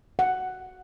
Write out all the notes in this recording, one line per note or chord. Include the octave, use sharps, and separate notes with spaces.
F#5